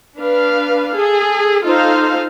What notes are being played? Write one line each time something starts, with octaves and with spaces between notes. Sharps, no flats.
D4 B4 F5
G#4 A4
D#4 F4 A4 C5 F5